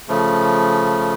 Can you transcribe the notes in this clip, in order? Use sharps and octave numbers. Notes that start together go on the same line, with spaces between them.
C#3 F3 A3